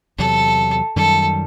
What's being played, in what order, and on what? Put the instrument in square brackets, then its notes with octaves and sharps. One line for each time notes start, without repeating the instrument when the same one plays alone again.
[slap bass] E2 C3 F#3 [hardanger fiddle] A4
[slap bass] F#2 D#3 G3 [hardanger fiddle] A4